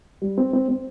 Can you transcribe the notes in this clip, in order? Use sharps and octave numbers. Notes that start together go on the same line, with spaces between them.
G3
C4
C4
C4